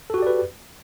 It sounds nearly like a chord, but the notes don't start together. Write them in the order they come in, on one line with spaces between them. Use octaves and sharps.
A4 F#4 G4 D5 B4